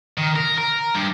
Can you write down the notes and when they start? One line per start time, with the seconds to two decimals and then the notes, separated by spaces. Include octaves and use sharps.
0.18 D#3
0.36 A#4
0.58 A#4
0.95 G2